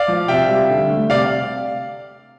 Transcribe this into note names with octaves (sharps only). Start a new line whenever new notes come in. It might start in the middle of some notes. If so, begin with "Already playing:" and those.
Already playing: D5 F5
F3
C3 E5 G5
G3
D3
A3
C3 D5 F5